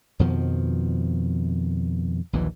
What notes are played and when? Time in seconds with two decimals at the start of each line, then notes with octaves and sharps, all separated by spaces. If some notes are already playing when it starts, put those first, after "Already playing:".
0.19 F2 B2 D#3 F3
2.33 A#1 D#2 A#2 E3